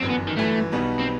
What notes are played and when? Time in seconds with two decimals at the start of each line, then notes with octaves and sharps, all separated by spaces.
0.01 G1 F#2 E3 C4
0.10 B3
0.28 D#3
0.37 G1 F#2 E3 A3
0.72 B1 B2 G3 B3 D#4
1.01 C4